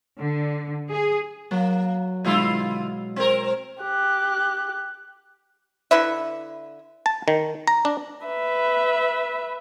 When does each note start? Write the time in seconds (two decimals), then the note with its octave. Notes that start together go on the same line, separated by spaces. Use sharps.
0.20 D3
0.90 G#4
1.51 F#3 A#3
2.25 B2 D3 G#3 E4 F4 E6
3.16 C4 A#4
3.82 G4 F#6
5.91 D3 E4 B4 E5
7.06 A5
7.28 D#3
7.67 A#5
7.85 D4
8.26 B4 E5